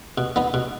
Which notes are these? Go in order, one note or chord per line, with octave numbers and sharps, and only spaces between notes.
B2
B3 D#4
B2